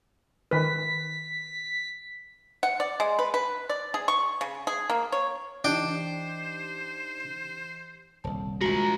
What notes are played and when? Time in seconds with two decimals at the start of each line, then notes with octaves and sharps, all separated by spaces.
0.51 D#3 B4 B6
2.63 F#5
2.80 D5
3.00 G#3
3.19 B4
3.34 B4
3.69 D5
3.94 G#4
4.08 C#6
4.41 C#3
4.67 G#4
4.90 A#3
5.12 C#5
5.64 E3 D4 D#4 G4 C5 G5
8.24 D#1 C2 A5
8.61 F3 G#3 F#4 A#4 A#5